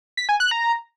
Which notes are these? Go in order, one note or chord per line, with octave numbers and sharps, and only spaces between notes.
B6
G#5
F#6
A#5